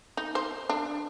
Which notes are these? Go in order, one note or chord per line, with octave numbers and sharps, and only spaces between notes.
D#4
C5
D4